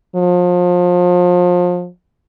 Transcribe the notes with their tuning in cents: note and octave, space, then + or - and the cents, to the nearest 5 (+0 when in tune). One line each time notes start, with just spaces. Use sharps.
F3 +30